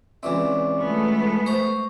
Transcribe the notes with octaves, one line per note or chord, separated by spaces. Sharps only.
C#2 E3 C4 D5 E5 D6
G#3 A3 B3 F4 G#5
C5 A#5 C6 C#6